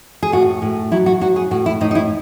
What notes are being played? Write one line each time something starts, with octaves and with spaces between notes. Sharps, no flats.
G#4
A2 F#4
A2
F#3 E4
F#4
F#3 F#4
G#4
A2 F#4
E4
A2 D#4
D#4
E4